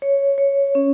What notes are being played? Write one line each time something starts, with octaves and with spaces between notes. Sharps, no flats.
C#5
C#5
C#4